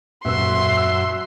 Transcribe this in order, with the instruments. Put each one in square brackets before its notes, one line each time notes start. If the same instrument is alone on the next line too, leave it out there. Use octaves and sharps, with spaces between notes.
[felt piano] D#1 E6 [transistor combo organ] F#2 [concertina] E5 [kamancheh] C6
[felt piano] E6